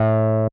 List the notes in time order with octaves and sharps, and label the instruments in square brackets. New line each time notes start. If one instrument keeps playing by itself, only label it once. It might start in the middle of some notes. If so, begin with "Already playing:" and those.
Already playing: [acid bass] A2